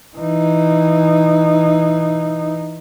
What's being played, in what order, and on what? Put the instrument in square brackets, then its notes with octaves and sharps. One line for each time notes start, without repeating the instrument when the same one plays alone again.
[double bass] E3 D#4